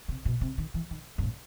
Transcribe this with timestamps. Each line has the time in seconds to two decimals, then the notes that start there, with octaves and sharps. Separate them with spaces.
0.08 C3
0.25 B2
0.41 C3
0.58 D#3
0.74 E3
0.91 D#3
1.18 G2
1.23 A2